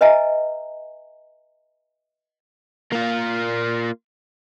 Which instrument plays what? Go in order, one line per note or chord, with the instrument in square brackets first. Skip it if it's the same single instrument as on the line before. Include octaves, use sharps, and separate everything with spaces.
[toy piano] B4 D#5 E5 G#5 A#5
[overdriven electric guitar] A#3 F4